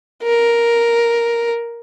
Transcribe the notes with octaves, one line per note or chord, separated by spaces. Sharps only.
A#4